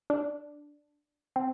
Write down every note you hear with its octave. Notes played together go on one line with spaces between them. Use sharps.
D4
C4